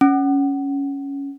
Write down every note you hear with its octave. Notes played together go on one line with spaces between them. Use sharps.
C#4